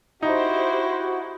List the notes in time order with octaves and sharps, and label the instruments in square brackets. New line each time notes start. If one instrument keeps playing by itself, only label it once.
[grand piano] D#4 [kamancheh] E4 [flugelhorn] F#4 [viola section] G4 C5